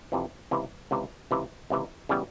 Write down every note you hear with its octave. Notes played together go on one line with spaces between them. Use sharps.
F2 C3 E3
C#2 C3 E3
C#2 C3 E3
C#2 C3 E3
C#2 C3 E3
C#3 E3 G3 B3